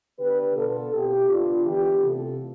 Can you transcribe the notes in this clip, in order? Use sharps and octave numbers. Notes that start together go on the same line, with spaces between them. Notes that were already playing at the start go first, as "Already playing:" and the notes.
D3 G3 B3 D4 G4 B4
B2 B3 D4 F4 A4
B2 A3 C4 E4 G4
D3 G3 B3 D4 F4
E3 B3 D4 E4 G4
C3 E3 A3 F4 A4